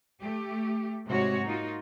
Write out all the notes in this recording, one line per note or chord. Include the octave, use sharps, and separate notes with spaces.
A3 G4
G#2 C3 G#3 F#4 C#5
A#3 D#4 F4 F#4